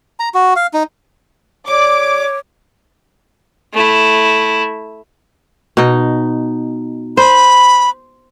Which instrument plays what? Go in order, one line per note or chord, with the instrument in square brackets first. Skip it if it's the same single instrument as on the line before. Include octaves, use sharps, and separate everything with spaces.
[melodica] A#5
F#4
F5
D#4
[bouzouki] G3 D5 [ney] C#5 [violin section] D6
[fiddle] A3 E4
[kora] B2 D#4
[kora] C5 [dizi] B5